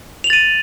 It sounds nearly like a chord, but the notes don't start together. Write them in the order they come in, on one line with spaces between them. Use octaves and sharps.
F7 F#7 A6 D#7